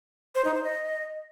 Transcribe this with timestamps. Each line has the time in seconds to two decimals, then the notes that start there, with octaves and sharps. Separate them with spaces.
0.35 C5
0.45 D#4
0.54 C5
0.64 D#5